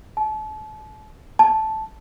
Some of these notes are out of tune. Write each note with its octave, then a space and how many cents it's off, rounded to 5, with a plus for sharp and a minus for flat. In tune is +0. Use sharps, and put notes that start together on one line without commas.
A5 -35
A5 -10